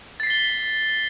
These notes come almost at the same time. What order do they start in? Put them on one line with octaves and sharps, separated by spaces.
A6 C7 B6 G7